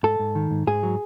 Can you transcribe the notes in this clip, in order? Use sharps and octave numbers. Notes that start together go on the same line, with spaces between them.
G#2 A4
G#2
D#3
G#2
G#2 G#4
F#3